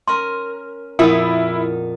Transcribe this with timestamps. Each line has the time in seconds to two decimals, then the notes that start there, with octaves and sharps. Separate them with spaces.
0.08 C#4 A#4 C6
0.99 F2 A#2 E4 G#4 A#4 F#5